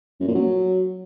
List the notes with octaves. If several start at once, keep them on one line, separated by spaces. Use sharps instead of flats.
F#2
A#2
F#3